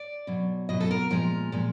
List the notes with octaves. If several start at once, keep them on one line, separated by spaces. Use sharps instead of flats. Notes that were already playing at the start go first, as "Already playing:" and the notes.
Already playing: D5
B2 F#3
B2 F#3 D#5
A4
A#4
A#2 F3 G#3 A#4
A#2 F3 G#3